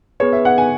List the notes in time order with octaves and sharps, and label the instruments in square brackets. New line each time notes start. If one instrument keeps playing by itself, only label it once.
[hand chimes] B3 G#4 B4 [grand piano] C#5
[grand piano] E5
F#5
G#5